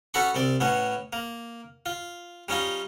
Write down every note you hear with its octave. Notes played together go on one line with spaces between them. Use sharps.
C#4 F#4 A4 B5 C#6
C2 C4 D5
A2 B3 C#4
A#3
F4
G3 C#4 D#4 F4